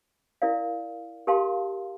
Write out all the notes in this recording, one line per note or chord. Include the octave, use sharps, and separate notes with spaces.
E4 A#4 D5 F5
G4 A#4 F5 A5 C6